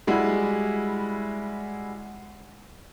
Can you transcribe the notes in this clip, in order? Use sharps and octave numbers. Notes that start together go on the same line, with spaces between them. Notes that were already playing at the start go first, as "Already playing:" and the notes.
G3 G#3 E4 F#4